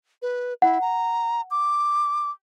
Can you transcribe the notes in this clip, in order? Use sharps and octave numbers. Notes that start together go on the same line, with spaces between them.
B4
E4 F#5
A#5
D6